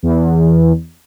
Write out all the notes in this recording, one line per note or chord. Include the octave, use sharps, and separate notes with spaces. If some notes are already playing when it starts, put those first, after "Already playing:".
E2